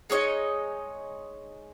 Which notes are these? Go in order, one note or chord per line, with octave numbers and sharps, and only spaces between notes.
G#3 D#4 C#5 D#5